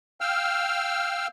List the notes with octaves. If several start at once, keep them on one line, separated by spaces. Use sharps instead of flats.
F5 G5 E6 F6